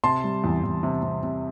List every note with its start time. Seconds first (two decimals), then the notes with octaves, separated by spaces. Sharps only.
0.04 C3 A5 C6
0.24 G3
0.44 E2
0.64 E2
0.83 C3
1.03 C3
1.23 C3